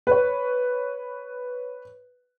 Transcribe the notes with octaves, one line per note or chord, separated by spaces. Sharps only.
B4 C#5